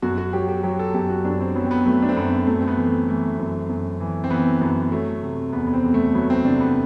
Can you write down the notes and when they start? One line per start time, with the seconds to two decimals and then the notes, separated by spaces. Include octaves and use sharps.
0.02 F#2 F#4
0.18 F#4
0.33 F#3 G4
0.48 G4
0.63 F#3 G4
0.79 A4
0.94 F#2 G4
1.10 F#4
1.25 F#2 D4
1.41 C4
1.55 F#3 B3
1.65 C4
1.71 B3
1.86 F#3 A3
2.02 D4
2.09 C4
2.17 F#2 B3
2.47 F#2 A3
2.61 C4
2.67 B3
2.78 E3
2.88 A3
3.09 E3 A3
3.39 F#2
3.70 F#2
4.00 E3
4.24 C4
4.30 E3 B3
4.61 F#2 B3
4.92 F#3 A3
5.23 C3
5.53 E2 B3
5.67 B3
5.73 C4
5.83 E2
5.94 A3
6.15 F#3 B3
6.30 C4
6.45 C3 D4
6.60 B3